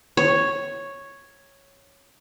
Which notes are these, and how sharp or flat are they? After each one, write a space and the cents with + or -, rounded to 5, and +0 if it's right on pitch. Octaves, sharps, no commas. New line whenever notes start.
C#5 -5